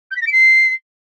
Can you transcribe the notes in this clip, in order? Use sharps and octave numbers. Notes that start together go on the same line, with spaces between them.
G6
B6
A#6
D7
C7